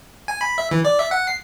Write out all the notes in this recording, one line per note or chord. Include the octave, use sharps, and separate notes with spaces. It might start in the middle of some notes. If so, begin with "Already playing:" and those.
G#5
B5
E5
E3
D5
E5
F#5
C7